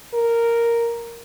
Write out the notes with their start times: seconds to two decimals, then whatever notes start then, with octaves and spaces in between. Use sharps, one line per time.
0.14 A#4